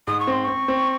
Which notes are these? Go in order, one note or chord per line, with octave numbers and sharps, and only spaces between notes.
G#2 D#6
C#6
C4 C6
C4 C#6
C4